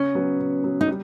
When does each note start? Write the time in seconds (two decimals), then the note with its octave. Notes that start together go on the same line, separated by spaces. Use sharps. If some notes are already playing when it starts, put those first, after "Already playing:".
Already playing: C#3 C#4
0.15 F#3 B3
0.39 C#3
0.64 F#3 B3
0.81 D#4
0.88 G3